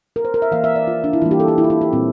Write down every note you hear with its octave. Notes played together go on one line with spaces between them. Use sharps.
A#4
C5
A#4
E5
E3 A#3 F5
E5
D5
F4
D4
E4
E3 G3 A#3 F4
G4
A4
G4
E4
F4
E4
G4
A#2 G3 C4